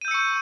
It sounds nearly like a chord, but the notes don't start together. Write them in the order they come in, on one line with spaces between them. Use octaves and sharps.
D#7 G6 E6 C#7 C#6